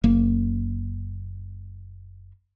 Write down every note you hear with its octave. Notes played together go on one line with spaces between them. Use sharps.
F#1 A#3